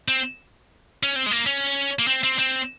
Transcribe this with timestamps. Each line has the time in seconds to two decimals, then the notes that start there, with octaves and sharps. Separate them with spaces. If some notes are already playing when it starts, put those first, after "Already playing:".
0.08 C4
1.03 C#4
1.16 C4
1.26 G#3
1.31 A#3
1.46 C#4
1.99 A#3
2.07 C4
2.24 C4
2.38 C4